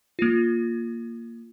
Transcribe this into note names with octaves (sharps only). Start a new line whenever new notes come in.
A#3 F4